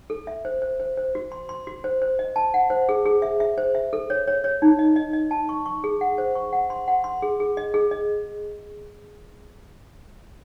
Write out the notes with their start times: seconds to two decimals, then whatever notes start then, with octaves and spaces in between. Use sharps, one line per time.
0.10 A4
0.27 E5
0.45 C5
0.62 C5
0.80 C5
0.97 C5
1.15 F#4
1.32 C6
1.49 C6
1.67 F#4
1.84 C5
2.02 C5
2.19 D#5
2.36 A5
2.54 F#5
2.70 C5
2.89 G#4
3.06 G#4
3.22 E5
3.40 E5
3.58 C5
3.75 E5
3.93 A4
4.10 C#5
4.28 C#5
4.44 C#5
4.62 D#4
4.79 D#5
4.96 D#5
5.13 D#5
5.31 A5
5.49 C#6
5.66 C#6
5.84 G#4
6.01 F#5
6.18 C5
6.35 C#6
6.53 F#5
6.70 C6
6.88 F#5
7.04 C6
7.22 G#4
7.40 G#4
7.57 D#5
7.74 G#4
7.91 D#5